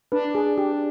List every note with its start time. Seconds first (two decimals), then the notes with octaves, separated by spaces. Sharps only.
0.12 D4 B4
0.35 G#4
0.58 G4